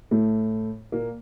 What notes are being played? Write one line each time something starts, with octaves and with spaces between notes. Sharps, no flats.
A2 A3
A#2 A#3